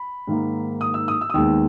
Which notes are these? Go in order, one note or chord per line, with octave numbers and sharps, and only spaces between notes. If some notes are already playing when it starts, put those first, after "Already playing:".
Already playing: B5
G#2 D#3 A#3
D#6
E6
D#6
E6
D#6
D#2 D#3 G#3 B3 E6